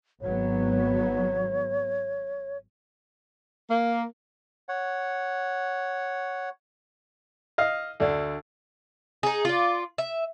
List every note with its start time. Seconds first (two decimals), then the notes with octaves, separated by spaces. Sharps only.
0.22 G#1 F#3 B3 C#5
3.70 A#3
4.69 C#5 F#5
7.58 D#5 F5
8.00 D2 D3 D4
9.23 D#4 G#4
9.45 F4 D5
9.98 E5